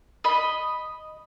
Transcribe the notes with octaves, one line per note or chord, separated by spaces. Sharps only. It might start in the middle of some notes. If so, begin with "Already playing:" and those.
D#5 B5